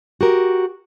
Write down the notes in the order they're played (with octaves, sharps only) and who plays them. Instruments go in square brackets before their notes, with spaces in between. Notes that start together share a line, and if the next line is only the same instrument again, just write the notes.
[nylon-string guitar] F#4 G4 A#4